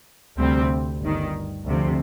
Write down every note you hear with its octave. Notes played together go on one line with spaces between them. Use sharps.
D2 C3 G3 C4
G1 G2 D#3
D2 C3 F3